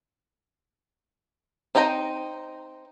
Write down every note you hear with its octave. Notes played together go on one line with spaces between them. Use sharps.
C4 D#4 D#5 G5 A#5